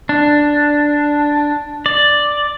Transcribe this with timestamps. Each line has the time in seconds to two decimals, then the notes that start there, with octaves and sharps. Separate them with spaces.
0.09 D4
1.86 D5